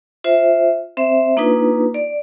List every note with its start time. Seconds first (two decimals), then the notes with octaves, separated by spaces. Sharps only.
0.24 F4 C5 E5
0.97 C4 C5 E5
1.37 A#3 D4 D#4 F4 B4
1.94 D5